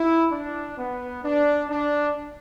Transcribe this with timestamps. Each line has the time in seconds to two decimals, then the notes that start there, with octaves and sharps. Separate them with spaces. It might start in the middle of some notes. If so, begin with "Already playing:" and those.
Already playing: E4
0.31 D4
0.77 B3
1.23 D4
1.69 D4